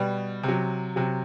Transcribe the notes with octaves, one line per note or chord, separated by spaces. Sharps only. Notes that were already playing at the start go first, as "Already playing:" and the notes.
Already playing: B2 G3
C3
F#3
C3 F#3